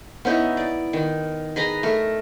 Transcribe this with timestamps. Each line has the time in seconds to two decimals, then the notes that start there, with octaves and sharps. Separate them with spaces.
0.25 B3 C#4 D#4 E4
0.57 D5
0.93 D#3
1.56 G#4 B4 D#5 A#5
1.83 A3 A#4